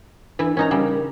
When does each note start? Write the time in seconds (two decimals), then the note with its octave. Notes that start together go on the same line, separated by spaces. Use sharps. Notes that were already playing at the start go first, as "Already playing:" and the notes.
0.39 E3 D4 E4
0.57 C#4 D#4 A#4 A#5
0.71 C#3 G3